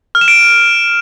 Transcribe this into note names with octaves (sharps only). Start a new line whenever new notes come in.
F6
E7
D7